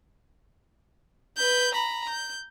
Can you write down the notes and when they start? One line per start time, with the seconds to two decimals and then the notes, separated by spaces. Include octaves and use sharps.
1.37 B4 G6
1.75 A#5 B5
2.09 G6